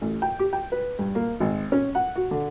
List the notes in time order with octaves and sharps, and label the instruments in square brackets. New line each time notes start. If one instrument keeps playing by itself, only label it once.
[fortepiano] A1
G5
G4
G5
B4
G2
A#3
G#1
C#4
F#5
F#4
D3